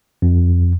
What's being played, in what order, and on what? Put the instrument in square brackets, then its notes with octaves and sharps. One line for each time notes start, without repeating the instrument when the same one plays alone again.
[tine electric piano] F2